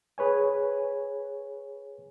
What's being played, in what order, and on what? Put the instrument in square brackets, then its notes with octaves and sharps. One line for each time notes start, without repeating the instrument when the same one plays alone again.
[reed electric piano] G#4 B4 C#5 G#5